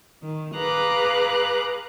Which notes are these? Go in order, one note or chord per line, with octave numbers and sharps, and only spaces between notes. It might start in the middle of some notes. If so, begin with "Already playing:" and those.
D#3
G#4 B4 F5 A#5 D6 F#6